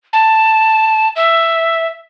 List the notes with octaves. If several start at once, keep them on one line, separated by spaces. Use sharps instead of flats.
A5
E5